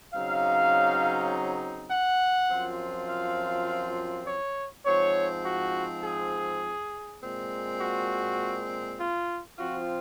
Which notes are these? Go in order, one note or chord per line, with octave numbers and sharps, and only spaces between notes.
C#3 F#3 C4 D#4 F5
F#5
F#2 F3 C4 F4
F5
C#5
G#2 F3 C4 C#5
F#4
G#4
A#2 G#3 C4
F#4
F4
F3 C4 F4 F#4